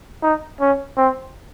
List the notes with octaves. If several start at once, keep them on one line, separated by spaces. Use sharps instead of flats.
D#4
C#4
C4